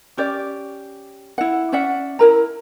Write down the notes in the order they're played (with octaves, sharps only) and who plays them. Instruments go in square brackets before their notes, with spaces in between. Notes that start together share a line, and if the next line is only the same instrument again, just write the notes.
[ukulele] C#4 G4 D5
E4 F#5
C#4 D5 E5 F#5
E4 A#4 A#5